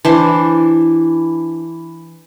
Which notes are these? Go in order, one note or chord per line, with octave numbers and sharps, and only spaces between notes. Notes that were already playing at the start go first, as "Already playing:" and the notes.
E3 D4 C5